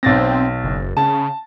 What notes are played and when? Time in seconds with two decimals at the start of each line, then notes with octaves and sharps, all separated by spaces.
0.03 B1 C4 A6 A#6
0.64 F#1
0.97 C#3 A5